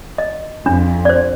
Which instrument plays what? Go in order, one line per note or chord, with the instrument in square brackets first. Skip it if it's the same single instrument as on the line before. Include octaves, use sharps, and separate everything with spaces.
[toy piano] D#5
[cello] F2 [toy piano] D4
[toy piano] C5 D5